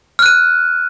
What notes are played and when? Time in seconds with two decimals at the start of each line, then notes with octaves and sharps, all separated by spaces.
0.19 F6
0.22 F#6
0.26 D#7